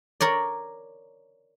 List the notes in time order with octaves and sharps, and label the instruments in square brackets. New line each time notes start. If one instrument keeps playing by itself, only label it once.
[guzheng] A#4 C#5 D5